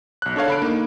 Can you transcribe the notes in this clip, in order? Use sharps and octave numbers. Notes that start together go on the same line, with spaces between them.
B1 F#6
D4 A4 C#5 F5
D3 B5 D7
A#3 D#4